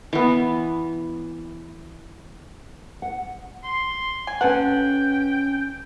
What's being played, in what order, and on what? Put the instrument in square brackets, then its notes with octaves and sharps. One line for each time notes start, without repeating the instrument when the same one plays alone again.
[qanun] E3 B3
[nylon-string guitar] F#5
[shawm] C6
[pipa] G#5
[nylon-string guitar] C#4 B4 [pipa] A4 F#5 [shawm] G5